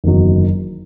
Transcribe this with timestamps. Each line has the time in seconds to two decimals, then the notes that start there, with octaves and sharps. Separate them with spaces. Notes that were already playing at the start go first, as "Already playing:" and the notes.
0.04 F#1 E2 D#3 F#3